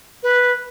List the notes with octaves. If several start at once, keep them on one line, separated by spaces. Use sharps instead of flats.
B4